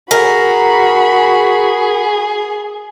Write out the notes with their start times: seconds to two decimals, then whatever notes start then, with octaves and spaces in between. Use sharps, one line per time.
0.11 F#4 G#4 A#4 B5